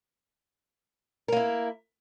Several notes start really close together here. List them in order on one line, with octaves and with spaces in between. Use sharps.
A#4 A#3 E4